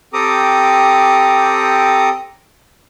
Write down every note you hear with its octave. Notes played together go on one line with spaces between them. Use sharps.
C4 G4 A4 A#5 D6 D#6